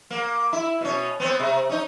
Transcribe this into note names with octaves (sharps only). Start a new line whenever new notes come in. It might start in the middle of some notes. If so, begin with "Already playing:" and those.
A#3
E4
B2 C#4
B3 C4
C3
C#4 D#4